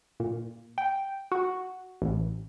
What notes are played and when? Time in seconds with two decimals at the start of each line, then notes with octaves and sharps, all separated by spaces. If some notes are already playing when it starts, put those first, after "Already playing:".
0.20 A#2
0.78 G5
1.32 F#4
2.02 A1